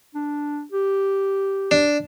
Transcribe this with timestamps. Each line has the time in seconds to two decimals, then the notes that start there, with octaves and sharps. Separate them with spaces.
0.15 D4
0.72 G4
1.71 D4